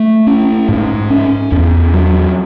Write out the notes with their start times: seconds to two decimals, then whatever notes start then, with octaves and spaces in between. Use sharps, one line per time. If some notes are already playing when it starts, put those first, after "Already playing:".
Already playing: A3
0.27 C#4
0.69 G#2
1.10 C#4
1.52 E2
1.94 F#3